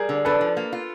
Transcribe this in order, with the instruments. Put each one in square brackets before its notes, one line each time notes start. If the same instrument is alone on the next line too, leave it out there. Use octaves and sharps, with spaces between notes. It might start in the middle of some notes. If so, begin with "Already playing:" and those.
Already playing: [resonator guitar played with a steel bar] G3 [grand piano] G#4 A#4
[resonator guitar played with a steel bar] D3
[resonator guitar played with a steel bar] D4 [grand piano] A4 B4
[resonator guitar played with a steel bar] F3
A#3
F4